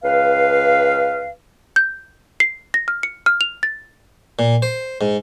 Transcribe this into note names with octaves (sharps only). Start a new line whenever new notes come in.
C#2 B4 F5
G6
C7
A#6
F6
C#7
F6
F7
A6
A#2
C5
G#2